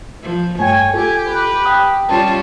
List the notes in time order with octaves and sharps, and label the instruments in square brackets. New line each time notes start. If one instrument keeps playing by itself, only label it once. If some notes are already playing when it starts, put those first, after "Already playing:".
[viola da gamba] F3
[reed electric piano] G2 A3 G5 [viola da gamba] C#5 [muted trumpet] G#5
[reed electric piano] F4 A4 [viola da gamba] G4 [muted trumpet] G#5
[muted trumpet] B4
[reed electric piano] G5 D#6
[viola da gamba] G3 C#4 F4 [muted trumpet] A5